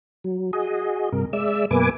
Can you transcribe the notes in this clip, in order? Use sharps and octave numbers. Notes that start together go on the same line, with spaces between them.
F#3
F#4 G#4 D#5
G2 C3 A#4
G#3 D5 E5 E6
F#2 B2 A#3 B4 G#5 D6